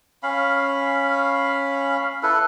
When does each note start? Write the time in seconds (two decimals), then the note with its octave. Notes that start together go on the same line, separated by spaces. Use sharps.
0.23 C#4 F5 B5
2.23 E4 A4 B4